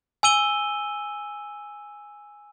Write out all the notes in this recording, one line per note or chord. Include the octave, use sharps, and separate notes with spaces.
G#5 E6 D#7 G7